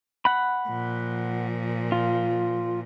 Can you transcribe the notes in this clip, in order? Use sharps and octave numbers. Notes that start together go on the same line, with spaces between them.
F#5 B5
A#2 F3
F4